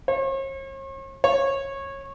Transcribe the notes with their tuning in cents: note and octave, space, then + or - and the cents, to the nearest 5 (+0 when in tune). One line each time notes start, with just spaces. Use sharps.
C#5 -45
C#5 -20